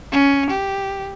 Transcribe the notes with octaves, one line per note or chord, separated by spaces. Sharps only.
C#4
G4